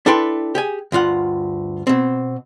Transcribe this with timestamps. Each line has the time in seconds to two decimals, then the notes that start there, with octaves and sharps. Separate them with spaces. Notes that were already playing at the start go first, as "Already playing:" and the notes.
0.06 D4 E4 A4 B4 G5 C6
0.55 G4 G#4 G#5
0.92 D2 G2 F4 F#5
1.87 B2 C4